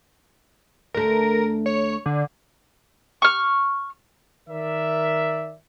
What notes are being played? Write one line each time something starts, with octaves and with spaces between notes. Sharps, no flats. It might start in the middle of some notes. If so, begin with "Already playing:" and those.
D2 A3 A#4
C#5
D3
C#6 F6
D#3 A#4 D5 E5